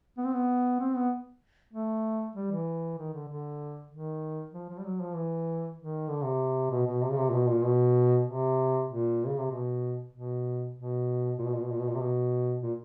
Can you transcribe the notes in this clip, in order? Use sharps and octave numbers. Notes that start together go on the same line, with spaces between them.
B3
C4
B3
C4
B3
A3
G3
E3
D#3
D3
D3
D#3
F3
F3
G3
F#3
F3
E3
D#3
D3
C3
B2
B2
C3
C#3
C3
A#2
B2
A#2
B2
C3
A#2
C#3
C3
B2
B2
B2
A#2
B2
A#2
B2
A#2
B2
A#2
C3
B2
A#2